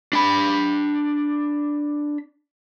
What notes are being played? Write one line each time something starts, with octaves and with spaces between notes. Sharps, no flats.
D4 B5